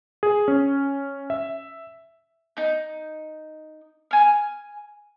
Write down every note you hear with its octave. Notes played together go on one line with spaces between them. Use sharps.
G#4
C#4
E5
D#4 G6
G#5 F6